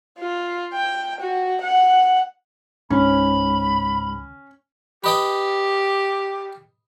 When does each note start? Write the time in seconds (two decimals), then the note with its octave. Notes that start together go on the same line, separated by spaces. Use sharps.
0.19 F4
0.74 G5
1.20 F#4
1.62 F#5
2.90 C#2 G#2 C#4 B5
5.04 G4 B4 D#5 G5